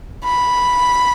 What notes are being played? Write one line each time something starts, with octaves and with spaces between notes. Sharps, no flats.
B5